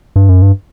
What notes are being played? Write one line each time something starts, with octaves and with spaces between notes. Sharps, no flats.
G2
F#2
G2